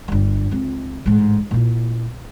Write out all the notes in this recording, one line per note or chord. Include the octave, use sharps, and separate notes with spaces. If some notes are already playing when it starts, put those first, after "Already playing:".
G1 G3
C#2 C4
A1 G#2
A#2 E4